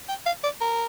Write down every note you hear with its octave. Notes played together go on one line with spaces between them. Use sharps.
G5
F5
D5
A#4